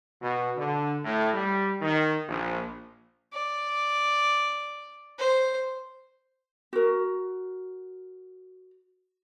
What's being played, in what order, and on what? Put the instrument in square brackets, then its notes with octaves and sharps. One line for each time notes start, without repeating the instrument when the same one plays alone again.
[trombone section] B2
D3
A2
G3
D#3
A#1
[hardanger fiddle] D5
C5
[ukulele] F#4 A#4